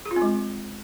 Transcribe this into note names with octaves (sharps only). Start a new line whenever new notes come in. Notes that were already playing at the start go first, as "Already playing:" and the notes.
G#4
F4
C4
G#3